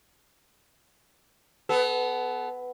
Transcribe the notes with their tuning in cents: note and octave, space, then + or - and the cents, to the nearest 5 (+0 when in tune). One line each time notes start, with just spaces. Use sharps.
B3 +15 A4 -30